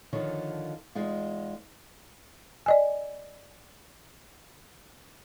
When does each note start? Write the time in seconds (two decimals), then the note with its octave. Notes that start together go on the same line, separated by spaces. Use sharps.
0.13 D3 D#3 F3 C#5
0.95 E2 G#3 D#4 F4
2.66 D5 D#5 G#5